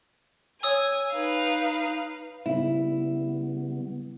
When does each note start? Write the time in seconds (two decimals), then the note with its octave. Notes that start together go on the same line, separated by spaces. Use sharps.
0.63 C#5 G#5 D#6 E6
1.11 D#4 B4 F5
2.46 C#3 G3 B3 E4